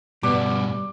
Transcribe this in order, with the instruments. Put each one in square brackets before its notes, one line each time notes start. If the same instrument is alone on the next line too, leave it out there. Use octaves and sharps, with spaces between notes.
[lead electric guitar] G2 B2 [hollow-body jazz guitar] G3 B3 [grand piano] D6